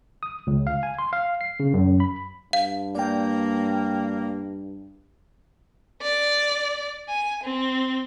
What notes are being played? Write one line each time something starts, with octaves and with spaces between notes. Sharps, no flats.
D#6
C#2
F5
G#5
C6
F5
C7
C#3
F#2
B5
G2 F5
A#3 D5 G5
D5
G#5
C4